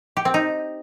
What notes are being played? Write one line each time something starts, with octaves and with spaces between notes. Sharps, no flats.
G4
C4
D#4